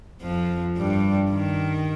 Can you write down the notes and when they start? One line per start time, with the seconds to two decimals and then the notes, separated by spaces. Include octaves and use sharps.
0.22 F2 F3
0.77 G2 G3
1.30 D#3